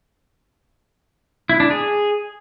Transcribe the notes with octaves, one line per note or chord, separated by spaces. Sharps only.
E4
D4
G#4